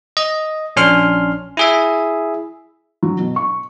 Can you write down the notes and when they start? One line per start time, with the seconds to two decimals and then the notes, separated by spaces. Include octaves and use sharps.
0.17 D#5
0.76 A#1 C#4 D4 C6 F6
1.57 E4 G#4 E5
3.03 F#3
3.19 B2
3.36 C#6